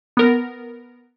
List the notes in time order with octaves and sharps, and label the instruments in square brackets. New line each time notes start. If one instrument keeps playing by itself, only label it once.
[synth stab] B3 A#4